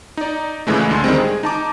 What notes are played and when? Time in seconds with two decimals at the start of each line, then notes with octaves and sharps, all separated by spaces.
0.17 D#4 D5
0.67 A#2 C#3 E3 G#3 A3
0.89 D2 D3 C6
1.04 D#3 G3 G#3 C4
1.18 G#4
1.43 D#4 A5 D6